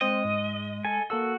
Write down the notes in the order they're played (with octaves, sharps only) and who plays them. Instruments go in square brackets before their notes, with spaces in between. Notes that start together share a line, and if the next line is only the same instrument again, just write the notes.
[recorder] G#3 [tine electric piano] C4 C5 G5 [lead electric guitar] D#5
[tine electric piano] G#2
[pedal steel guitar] A4 G#5
[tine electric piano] A#3 A4 E6 [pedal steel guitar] F#4